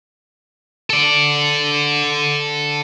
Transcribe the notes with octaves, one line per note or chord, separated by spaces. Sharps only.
A4 D5